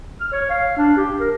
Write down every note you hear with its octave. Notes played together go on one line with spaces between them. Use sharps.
F6
C#5
F5
D4
G4
A#4